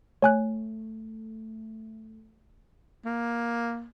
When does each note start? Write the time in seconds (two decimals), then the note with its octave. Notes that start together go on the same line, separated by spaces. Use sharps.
0.22 A3 C#5 G#5 F#6
3.05 A#3